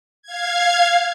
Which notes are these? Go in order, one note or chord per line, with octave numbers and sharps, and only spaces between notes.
F5 G#6